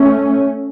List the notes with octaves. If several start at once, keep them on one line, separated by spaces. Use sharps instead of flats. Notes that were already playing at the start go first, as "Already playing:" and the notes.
Already playing: A3 C#4